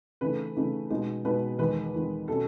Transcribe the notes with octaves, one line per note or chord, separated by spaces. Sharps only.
C#3 E3 A3 D#4 B4
C#3 E3 A3 D#4
B2 G#3 B3 D#4
B2 G#3 B3 D#4 B4
E2 D#3 G#3 B4
E2 D#3 G#3
B2 F#3 C#4 A4